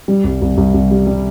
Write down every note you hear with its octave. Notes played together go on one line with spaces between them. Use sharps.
G3
C2
C2
C2
C2
G3
G3